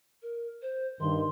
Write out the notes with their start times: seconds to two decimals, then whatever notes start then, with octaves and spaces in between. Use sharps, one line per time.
0.22 A#4
0.62 C5
1.00 G2 D#3 C6